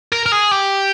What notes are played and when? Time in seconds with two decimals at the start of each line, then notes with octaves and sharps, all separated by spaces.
0.12 A#4
0.26 A#4
0.32 G#4
0.51 G4